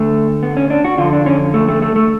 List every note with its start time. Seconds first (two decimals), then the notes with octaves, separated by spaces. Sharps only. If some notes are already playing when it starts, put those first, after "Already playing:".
Already playing: D2 D3 A3
0.43 B3
0.57 C#4
0.70 D4
0.85 F#4
0.98 F2 D3 F4
1.13 D4
1.26 C#4
1.54 A3
1.68 A3
1.82 A3
1.96 A3